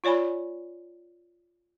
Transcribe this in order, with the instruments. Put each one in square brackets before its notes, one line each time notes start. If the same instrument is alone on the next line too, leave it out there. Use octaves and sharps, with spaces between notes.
[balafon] F4 C#5 D5 G#5 B5